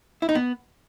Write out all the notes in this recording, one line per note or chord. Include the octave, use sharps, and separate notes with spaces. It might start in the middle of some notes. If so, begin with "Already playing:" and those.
E4
D#4
B3